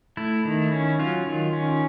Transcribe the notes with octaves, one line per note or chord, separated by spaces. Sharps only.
A3 E4
D#3
C#4
F#3 F4
D#3
C#4